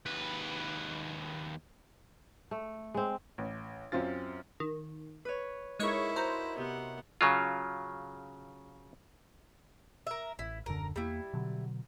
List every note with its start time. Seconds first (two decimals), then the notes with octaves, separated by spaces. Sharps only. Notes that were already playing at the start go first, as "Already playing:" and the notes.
0.06 D#2 B4
2.51 A3
2.94 G#3 C4
3.38 A1
3.92 F#2 C4 C#4 F4 A6
4.60 D#3
5.25 B4 C#5
5.79 G#3 D#4 E4 A#4 C#5 C#6
6.16 F#4 C5 A#5
6.58 C3 B3 F#5
7.21 C#3 F#3 F4
10.07 A#4 E5
10.39 A1 E4
10.66 D#1 F#2 D3 A#4
10.96 E2 G3 A#3 E4
11.34 B2 D3 F#3